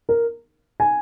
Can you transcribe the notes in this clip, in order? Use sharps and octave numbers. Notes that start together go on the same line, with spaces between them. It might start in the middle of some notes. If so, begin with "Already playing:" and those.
A#4
G#5